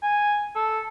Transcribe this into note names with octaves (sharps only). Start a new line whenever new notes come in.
G#5
A4